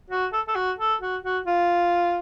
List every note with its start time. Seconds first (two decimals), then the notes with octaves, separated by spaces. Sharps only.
0.10 F#4
0.33 A4
0.48 A4
0.55 F#4
0.78 A4
1.01 F#4
1.23 F#4
1.46 F4